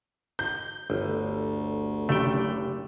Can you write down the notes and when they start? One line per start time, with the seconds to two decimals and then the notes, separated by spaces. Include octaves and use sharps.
0.39 G6
0.90 G1 D2
2.09 F#1 A3 G4 G5